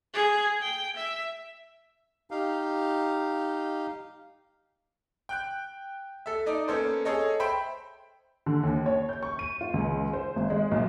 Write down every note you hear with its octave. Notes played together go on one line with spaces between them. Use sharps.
G#4
G5
E5
D#4 G4 F5
G5 F#6 G6
A4 E5
D#4 D5 D#5
A#3 B3 C#4 A4 C5
G#4 A4 C#5 D#5
C5 E5 G5 B5
D3
D#2
C#5
G6
C#6
D#7
F4
C#2
C5
G#1
G#3
B1